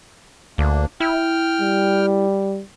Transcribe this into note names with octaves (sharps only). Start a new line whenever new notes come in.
D2 A#3 D4
E4 G5 F6
G3